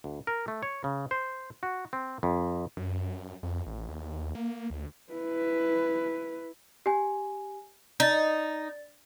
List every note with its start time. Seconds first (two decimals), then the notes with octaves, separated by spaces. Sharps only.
0.04 D2
0.27 A#4
0.48 A3
0.63 C#5
0.84 C#3
1.11 C5
1.63 F#4
1.93 C4
2.23 F2
2.77 F#2
3.43 F2
3.66 A1
3.89 D#2
4.35 A#3
4.70 D2
5.13 E4 B4
6.86 G4 G#5
8.00 D#4 D5 A6